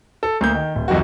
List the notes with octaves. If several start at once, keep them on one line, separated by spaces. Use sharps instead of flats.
A4
D2 A#3 G6
D#3
D1
C2 F2 D#3 F#4